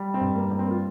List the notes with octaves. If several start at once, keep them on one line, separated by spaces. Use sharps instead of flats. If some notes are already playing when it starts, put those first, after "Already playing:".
Already playing: G3
C4
G2
A#3
G3 A#3
C4
F4